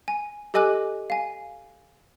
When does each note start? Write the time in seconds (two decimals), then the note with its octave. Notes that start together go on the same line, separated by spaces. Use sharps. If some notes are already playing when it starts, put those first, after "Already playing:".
0.08 G#5
0.54 G4 A4 D#5 G#5 D6 F#6
1.10 F5 G#5